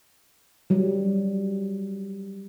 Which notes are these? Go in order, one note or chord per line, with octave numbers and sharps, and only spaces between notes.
F#3 G3